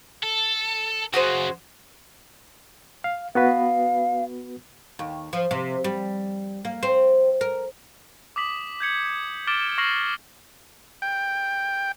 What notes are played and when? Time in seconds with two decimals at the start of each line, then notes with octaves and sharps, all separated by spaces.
0.23 A4
1.13 F#2 C#3 F#4 G#4 C5
3.04 F5
3.35 B3 F#4 B4 F5
4.99 D#2
5.33 F3
5.51 C3
5.84 G3
6.65 A#3
6.83 C4
7.41 A#4
8.36 D6 D#6 B6 F#7
8.80 G6 G#6 C#7 F#7
9.47 D6 F6 A6 D7 E7 G7
9.78 C#6 F6 A#6 C7 E7 F#7
11.02 G5